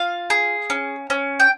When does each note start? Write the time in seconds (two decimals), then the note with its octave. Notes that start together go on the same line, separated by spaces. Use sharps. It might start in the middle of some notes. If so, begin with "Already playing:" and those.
Already playing: F4 F5
0.30 G#4
0.70 C#4
1.10 C#4
1.40 G5